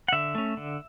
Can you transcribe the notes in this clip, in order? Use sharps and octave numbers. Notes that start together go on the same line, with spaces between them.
F#5
D3 E5
A3 C#4
D3